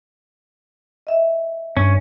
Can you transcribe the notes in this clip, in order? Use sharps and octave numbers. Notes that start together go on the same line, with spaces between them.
D#5 E5
G2 C#4